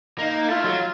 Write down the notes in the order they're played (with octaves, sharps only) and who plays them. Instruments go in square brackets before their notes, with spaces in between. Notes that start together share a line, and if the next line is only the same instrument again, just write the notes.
[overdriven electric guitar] A#3 [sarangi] D#4
[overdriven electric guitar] A3 [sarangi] F4
[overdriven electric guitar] F#3